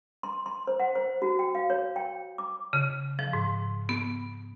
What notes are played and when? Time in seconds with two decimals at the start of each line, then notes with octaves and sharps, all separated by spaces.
0.23 C6
0.46 C6
0.67 C5
0.80 F#5
0.95 C5
1.22 F#4
1.39 G5
1.55 F5
1.70 C#5
1.96 G5
2.38 D6
2.73 C#3
3.19 F3
3.33 G#2
3.89 B3